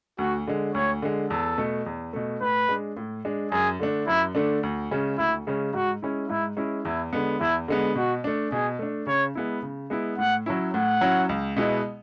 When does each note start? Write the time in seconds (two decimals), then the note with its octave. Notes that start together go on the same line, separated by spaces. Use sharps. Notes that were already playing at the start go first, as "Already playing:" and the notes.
0.18 D2 F#4
0.47 D3 G#3
0.74 D2 C#5
1.02 D3 G#3
1.30 E2 A4
1.58 B2 A3
1.86 E2
2.13 B2 A3
2.41 A2 B4
2.68 G#3 D4
2.97 A2
3.25 G#3 D4
3.52 F#2 G#4
3.80 D3 A3 D4
4.07 F#2 E4
4.35 D3 A3 D4
4.63 D2
4.91 C#3 G#3 C#4
5.18 D2 E4
5.47 C#3 G#3 C#4
5.73 G#2 F#4
6.02 G#3 C#4 E4
6.29 G#2 E4
6.57 G#3 C#4 E4
6.85 E2 E4
7.13 D3 G#3 B3
7.40 E2 E4
7.68 D3 G#3 B3
7.96 B2 F#4
8.24 A3 D4
8.51 B2 G#4
8.79 A3 D4
9.07 C#3 C#5
9.35 G#3 B3 E4
9.62 C#3
9.90 G#3 B3 E4
10.18 A2 F#5
10.46 F#3 C#4 E4
10.73 A2 F#5
11.01 F#3 C#4 E4
11.29 C#2
11.56 B2 G#3 B3 E4